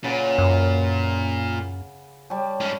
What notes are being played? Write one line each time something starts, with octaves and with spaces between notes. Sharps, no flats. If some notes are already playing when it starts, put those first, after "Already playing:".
A#2 C#3 B4 F#5
F#2
G3 C#5 A5
G#2 C#4